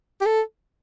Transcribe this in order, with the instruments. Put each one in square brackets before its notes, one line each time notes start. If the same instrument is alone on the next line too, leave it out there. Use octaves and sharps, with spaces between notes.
[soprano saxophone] G4
A4